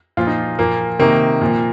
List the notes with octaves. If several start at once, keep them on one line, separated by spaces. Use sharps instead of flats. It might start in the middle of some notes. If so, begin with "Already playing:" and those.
A#2 F3 F4
D#4
A#2 F3 A#3
C3 D#3 A#3
A#2 F3